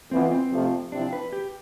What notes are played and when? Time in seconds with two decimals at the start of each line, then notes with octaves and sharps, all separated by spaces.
0.11 F2 E3 B3 C4 F4
0.31 C4
0.51 F2 C3 F3 A3
0.92 C3 F3 C4 D4 E4
1.13 B4
1.33 G4